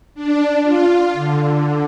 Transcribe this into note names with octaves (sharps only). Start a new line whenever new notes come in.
D4
F4
D3